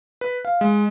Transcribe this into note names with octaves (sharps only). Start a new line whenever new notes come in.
B4
F5
G#3